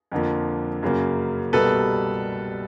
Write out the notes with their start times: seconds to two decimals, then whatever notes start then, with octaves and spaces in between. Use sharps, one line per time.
0.12 F2 D3 F3 A#3
0.83 F#2 C#3 F#3 A#3
1.53 C2 B2 G3 A#3 A4 B4